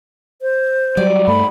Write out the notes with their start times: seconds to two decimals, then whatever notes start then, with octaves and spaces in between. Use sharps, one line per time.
0.42 C5
0.97 F#3 G3 D5
1.27 G2 A3 B5